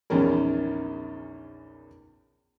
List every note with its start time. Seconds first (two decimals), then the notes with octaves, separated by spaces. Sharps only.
0.10 A#1 E2 D#3 C#4 A#4